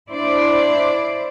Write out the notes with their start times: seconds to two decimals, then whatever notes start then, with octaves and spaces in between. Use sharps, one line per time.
0.10 D4 E4 C5 D5